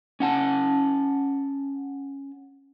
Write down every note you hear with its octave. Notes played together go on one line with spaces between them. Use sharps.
C#4 F#5 A5